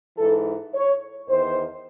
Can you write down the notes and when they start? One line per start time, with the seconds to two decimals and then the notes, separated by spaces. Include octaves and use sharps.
0.17 G#2 E3 A4
0.74 C#5
1.28 E2 D#3 C5